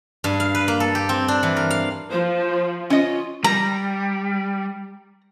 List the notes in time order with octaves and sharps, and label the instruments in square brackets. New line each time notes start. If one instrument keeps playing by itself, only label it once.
[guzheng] G2
F5
B4
A#3
A4
G4
C4
D4
E3
A#4
F5
[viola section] F3 F4 [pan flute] C5
[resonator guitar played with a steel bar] C#4 D#5 [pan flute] F4
[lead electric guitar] G3 [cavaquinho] A#5